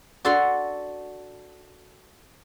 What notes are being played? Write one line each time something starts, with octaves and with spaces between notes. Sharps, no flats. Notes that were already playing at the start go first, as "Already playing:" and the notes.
D4 F#4 A4 F#5 C6